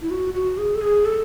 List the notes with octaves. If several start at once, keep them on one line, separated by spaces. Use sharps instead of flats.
E4
F#4
F#4
G#4
A4
G#4
A4